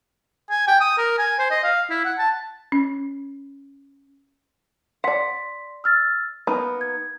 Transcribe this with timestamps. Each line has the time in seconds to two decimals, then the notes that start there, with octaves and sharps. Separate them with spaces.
0.50 G#5
0.67 G5
0.81 D#6
0.98 A#4
1.18 G#5
1.39 C5
1.51 D#5
1.63 F5
1.90 E4
2.05 F#5
2.18 A5
2.72 C#4
5.04 D5 F#5 C6 B6
5.84 E6 F6 A6
6.47 A#3 B3 D#4 B5
6.81 G#6